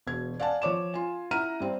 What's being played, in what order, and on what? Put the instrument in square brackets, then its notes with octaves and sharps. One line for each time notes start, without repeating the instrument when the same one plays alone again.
[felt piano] E1 B2 G#6
D5 F5 F#5 G#5 A5
F3 C#5 D6 E7
F4 G#5
E4 E5 F#5 A#5 F6 D#7
G2 C4